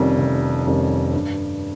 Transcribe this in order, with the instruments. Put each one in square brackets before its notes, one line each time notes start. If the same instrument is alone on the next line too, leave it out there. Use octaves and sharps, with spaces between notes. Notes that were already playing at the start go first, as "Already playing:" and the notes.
Already playing: [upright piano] F1 F2 D#3 G3 C#4
F1
F2 D#3 G3 C#4
G2